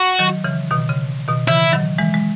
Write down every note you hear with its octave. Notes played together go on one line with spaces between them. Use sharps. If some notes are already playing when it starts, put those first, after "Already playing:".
Already playing: F#4
D#3 F#3
C#3 E3
B2 D#3
C#3
B2 D#3
C#3 E3 E4
D#3 F#3
E3 G#3
G#3